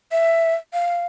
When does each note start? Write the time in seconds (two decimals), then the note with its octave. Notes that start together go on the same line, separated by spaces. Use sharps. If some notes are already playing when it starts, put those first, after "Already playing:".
0.12 E5
0.73 F5